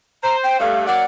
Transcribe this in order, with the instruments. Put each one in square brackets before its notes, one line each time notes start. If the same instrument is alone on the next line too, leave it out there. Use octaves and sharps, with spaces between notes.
[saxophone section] C5 [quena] A#5
[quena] G5
[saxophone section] G2 A3 [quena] F5
[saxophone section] F#3 A#3 D5 [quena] F#5